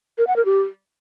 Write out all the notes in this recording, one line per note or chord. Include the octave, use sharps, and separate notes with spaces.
A#4
F#5
A#4
G4